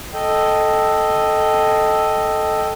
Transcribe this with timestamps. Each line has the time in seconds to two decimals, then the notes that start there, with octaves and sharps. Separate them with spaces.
0.14 A4 D#5 G5